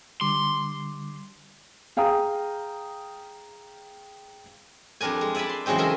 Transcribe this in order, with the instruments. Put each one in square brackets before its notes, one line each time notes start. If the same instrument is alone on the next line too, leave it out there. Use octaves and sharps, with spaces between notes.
[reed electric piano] D3 G3 D6 [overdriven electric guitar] C6
[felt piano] G#4 F5 G5 A#5 D#6
[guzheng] F2 G3 D4 A#4 G#5
G#3
D5 E5 G#5 A5 B5
C6
C#3 E3 F#3 G#3 C4 D#4
A4 A#4 D#5 E5 G#5